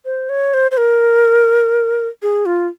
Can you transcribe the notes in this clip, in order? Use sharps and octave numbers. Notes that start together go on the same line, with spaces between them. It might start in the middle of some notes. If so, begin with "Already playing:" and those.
C5
C#5
C5
C5
A#4
G#4
F4